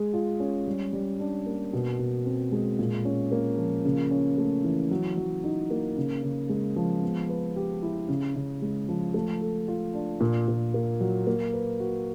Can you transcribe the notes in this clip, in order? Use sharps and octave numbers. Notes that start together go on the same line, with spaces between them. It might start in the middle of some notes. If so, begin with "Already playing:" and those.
Already playing: G#3 G#4
F4
C#4
G3
G3
D4
A#3
B2
B2
C4
G#3
A#2
C#4
A#3
F3
C#3
C#4
A3
E3
F#3
F#3
D#4
A#3
C#3
C#3
G#3
F3
B3
B4
G4
E4
C#3
C#3
G#3
F3
A3
A4
F4
D4
A#2
A#2
A#3
F#3
A#3
B4
F#4